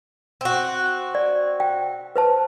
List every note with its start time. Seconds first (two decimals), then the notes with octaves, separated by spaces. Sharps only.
0.41 C4 F#4
1.15 D5
1.60 G5
2.16 B4 C5 A5